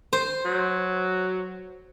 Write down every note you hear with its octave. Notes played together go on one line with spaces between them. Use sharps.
C5
F#3